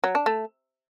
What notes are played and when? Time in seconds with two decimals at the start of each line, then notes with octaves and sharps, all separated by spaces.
0.04 F#3
0.15 D4
0.26 A3